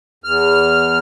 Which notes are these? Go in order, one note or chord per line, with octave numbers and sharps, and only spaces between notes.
E2 F6